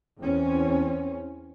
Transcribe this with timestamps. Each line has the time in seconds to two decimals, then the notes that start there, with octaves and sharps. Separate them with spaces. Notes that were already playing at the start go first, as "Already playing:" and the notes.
0.21 E2 C4 C#4